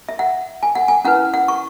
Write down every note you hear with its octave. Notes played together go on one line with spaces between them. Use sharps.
E5
F#5
G#5
F#5
G#5
C#4 E4 B4 F#5
F#5
C#6